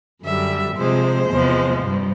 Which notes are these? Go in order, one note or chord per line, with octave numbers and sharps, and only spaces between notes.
F#2 D3 G3 E5
C3 F3 G#3 C5
E2 C3 F3 G#3
G2